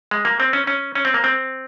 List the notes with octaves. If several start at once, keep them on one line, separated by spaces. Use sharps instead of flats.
G#3
A#3
C4
C#4
C#4
C#4
C4
A#3
C4